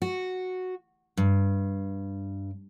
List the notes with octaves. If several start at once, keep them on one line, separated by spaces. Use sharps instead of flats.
F#4
G2